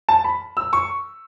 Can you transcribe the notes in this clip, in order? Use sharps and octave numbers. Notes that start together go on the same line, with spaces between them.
A5
B5
E6
C#6